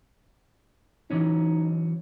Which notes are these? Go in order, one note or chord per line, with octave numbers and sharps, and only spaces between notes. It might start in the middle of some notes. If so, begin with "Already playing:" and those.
E3 F#3 C#4 D#4